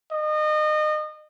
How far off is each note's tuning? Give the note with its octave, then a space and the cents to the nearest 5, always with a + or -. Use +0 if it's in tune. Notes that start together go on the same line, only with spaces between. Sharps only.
D#5 -30